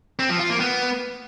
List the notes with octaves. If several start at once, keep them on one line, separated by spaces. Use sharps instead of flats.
C4
F3
F4
A#3
B3